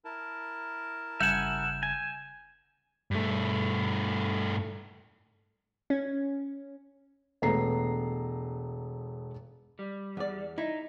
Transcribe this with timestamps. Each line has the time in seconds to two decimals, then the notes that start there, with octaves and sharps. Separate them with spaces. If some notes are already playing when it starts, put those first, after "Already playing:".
0.05 E4 A#4 A5
1.20 G1 C#3 G3 E5 F#5 G#5 G6 E7
1.83 G#5
3.11 G2 A3
5.90 C#4
7.42 E1 A3 B3 A#5 C7
9.79 G3
10.17 E2 D5
10.58 D#4 E4